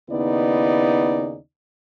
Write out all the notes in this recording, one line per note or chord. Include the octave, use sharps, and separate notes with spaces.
D#2 C#3 B3 D#4 E4 D5